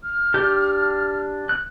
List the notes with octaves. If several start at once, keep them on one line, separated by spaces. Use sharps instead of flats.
F6
D4 G4 G6
F#6